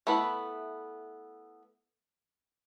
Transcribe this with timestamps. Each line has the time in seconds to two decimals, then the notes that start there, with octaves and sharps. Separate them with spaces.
0.07 A3 B3 E4 B4